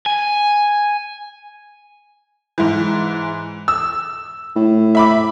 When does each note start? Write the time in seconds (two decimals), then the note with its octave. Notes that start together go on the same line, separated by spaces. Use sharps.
0.06 G#5
2.58 G#2 E3
3.68 E6
4.56 A2
4.95 E5 B5 D6